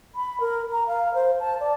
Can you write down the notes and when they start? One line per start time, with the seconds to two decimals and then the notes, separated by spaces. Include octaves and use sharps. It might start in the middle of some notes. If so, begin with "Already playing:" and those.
0.15 B5
0.40 A#4
0.72 A#5
0.87 F5
1.14 C5
1.40 A5
1.60 D5